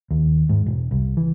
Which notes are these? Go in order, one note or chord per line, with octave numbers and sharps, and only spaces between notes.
D#2
G#2
E1
C2
E3